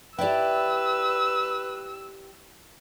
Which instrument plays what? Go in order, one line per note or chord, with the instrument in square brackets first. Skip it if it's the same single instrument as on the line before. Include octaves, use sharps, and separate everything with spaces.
[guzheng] E4 A5 [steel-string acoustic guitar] G4 D5 G5 [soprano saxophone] B4 [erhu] E6